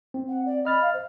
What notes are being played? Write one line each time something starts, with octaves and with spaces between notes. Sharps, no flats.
C4
F#5
D5
D#5 B5 F6 A6
F5
C5